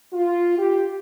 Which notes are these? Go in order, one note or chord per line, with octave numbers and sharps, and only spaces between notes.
F4
G4